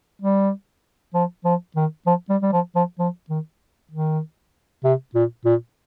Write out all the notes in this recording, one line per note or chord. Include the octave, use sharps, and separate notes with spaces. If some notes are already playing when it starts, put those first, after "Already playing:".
G3
F3
F3
D#3
F3
G3
G3
F3
F3
F3
D#3
D#3
C3
A#2
A#2